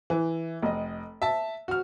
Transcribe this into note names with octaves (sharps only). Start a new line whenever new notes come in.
E3
F1 D#5
E5 A5
F#4 F6